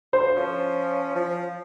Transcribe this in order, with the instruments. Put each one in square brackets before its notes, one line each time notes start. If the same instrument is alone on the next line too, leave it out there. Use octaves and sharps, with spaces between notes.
[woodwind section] D2 G2 [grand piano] C5
[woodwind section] F3 C#4
F3